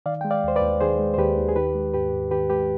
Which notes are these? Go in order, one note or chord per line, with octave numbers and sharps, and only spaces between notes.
D#3 D5 F5
G#3 G5
D5 F5
D#2 C5
B4 D5
D#2
D#3 G#4 C5
G#3
C5
D#2 G4 B4
D#2
G#4
D#3 G4 B4
G#3
G#2 G4 B4
G#2
D#3 G4 B4
G#3 G4 B4